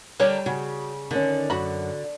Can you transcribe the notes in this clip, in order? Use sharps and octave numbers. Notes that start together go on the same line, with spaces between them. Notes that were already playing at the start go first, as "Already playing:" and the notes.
D3 G3 D4 G4 A#4 C#5
C#3 F#4
D3 D#3 C#4
F#2 F#4 B5